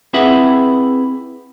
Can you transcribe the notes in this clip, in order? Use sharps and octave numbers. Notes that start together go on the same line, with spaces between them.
C4 E4 G#4 B4 E5 F#5